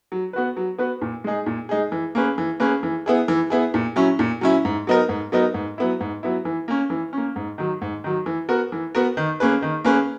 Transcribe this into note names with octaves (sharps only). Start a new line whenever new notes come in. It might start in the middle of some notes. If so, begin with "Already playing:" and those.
F#3
B3 F#4 B4
F#3
B3 F#4 B4
A#2
G#3 D#4 G#4
A#2
G#3 D#4 G#4
E3
A#3 C#4 G#4 B4
E3
A#3 C#4 G#4 B4
E3
B3 E4 G#4
E3
B3 E4 G#4
A#2
F#3 C#4 E4
A#2
F#3 C#4 E4
G#2
F#3 B3 D#4 A#4
G#2
F#3 B3 D#4 A#4
G#2
F#3 B3 E4
G#2
F#3 B3 E4
E3
A#3 C#4
E3
A#3 C#4
G#2
D#3 F#3
G#2
D#3 F#3
E3
B3 F#4 A#4
E3
B3 F#4 A#4
D#3
A#3 C#4 G#4 B4
D#3
A#3 C#4 G#4 B4